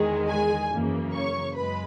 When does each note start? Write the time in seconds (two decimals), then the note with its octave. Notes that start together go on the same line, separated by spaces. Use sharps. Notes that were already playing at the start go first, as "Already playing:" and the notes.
Already playing: E2 D#3 G#3 G#4
0.29 G#4 G#5
0.71 F#2 C#3 E3 A#3
1.13 C#5 C#6
1.55 F#2 G#3 B4 B5